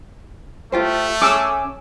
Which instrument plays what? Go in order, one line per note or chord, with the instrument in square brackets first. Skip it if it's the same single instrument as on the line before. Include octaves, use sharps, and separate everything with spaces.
[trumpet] A3 [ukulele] F4 G4 C5
[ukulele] C#4 G#4 G#5 [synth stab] D6 E6